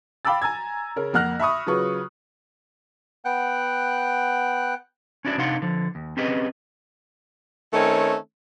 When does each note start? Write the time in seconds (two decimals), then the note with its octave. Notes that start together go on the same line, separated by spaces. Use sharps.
0.25 F5 G5 B5 D6 E6 A6
0.42 G#5 A#5 E6 G#6
0.96 C#3 C#4 A#4
1.13 F2 A#3 F#5 F6 F#6 A#6
1.40 E5 B5 C#6 D#6
1.66 C#3 F#3 F4 B4 C#6
3.25 B3 F#5 G5 F#6
5.25 C#4 D4 E4 F#4 A#4 D5
5.38 C3 D4 D#4 F5 F#5 C6
5.62 D3 F3
5.95 D#2
6.17 C4 C#4 G4 G#4 B4 D#5
7.73 D#3 A3 C4 C#4 D#4 C#5